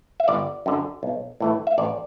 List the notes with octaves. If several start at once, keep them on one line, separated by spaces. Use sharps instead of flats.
E5
G1 D5
F#2 D3
B1
A2 E3 A3
E5
A1 D5